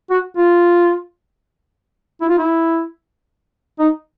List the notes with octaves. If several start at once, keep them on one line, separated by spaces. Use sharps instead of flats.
F#4
F4
E4
F4
E4
D#4